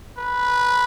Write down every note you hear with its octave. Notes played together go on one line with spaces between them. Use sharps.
B4